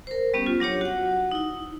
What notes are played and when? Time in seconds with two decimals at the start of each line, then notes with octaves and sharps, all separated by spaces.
0.07 A#4 C5
0.34 G3 B3 C#4 G4
0.46 F4
0.60 F#3 D4 G4 C#5
0.81 F#4 F#5
1.31 D#4 E4